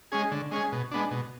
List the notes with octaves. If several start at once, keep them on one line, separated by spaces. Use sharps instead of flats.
G#3 C#4 G#4
D3
G#3 C#4 G#4
B2
G#3 B3 D4
B2